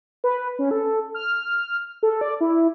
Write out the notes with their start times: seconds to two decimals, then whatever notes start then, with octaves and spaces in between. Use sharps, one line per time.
0.24 B4
0.59 C#4
0.71 A4
1.14 F6
2.03 A4
2.21 D5
2.41 E4